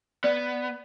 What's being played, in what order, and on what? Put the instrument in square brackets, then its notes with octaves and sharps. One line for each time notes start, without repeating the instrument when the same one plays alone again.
[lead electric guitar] B3 [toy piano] D5